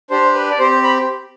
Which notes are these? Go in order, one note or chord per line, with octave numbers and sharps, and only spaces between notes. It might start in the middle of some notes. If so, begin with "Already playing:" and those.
D4 G4 C5
B4
D5
C4 G4 C5
B5